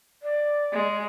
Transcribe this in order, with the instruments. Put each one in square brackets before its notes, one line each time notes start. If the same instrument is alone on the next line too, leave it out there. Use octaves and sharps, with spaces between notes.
[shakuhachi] D5
[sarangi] G#3